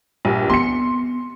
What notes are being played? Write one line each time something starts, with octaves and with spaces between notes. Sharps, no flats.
A#1 G2
B3 C4 C6 C#7